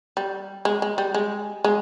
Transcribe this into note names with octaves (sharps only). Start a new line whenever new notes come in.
G3
G#3
G#3
G3
G#3
G#3